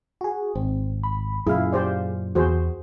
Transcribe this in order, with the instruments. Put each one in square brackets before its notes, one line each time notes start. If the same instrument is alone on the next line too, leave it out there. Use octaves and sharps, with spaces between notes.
[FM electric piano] F#4 G#4
[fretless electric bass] G#1 [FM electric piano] C4
[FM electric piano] B5
[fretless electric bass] F#2 A#2 C#3 [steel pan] E4 [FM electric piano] G#4 F5
[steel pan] G4 C5 D5
[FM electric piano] E2 [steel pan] F#4 G#4 C5